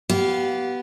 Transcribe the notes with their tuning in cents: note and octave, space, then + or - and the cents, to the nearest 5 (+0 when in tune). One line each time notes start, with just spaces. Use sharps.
B3 +0 G4 -25 F5 +0